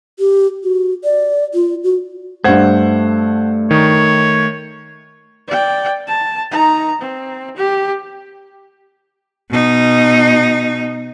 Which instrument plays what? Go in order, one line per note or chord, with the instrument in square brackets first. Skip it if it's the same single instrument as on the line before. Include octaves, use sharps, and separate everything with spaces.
[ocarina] G4
F#4
D5
F4
F#4
[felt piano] G2 G#6 [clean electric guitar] A3 [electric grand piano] C5 F#5
[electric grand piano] D#3 [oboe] C#5
[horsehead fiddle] D5 G5
A5
D#4 A#5
C4
G4
[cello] B2 D#4